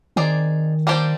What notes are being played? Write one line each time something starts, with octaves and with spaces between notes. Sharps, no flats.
D#3 C4 D#4 G#4 D5
G3 A#3 D4 G4 C5